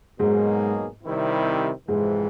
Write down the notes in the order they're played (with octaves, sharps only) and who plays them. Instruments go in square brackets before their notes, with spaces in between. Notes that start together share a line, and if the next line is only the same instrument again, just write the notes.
[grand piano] G#2 G#3 [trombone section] B2 F#3 A#3 D#4 G#4
[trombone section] C3 D#3 G3 C4 E4
[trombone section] F2 C3 E3 [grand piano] G#2 G#3